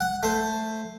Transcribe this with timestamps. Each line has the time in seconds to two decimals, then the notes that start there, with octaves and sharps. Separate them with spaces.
0.01 F#5
0.23 A3 C5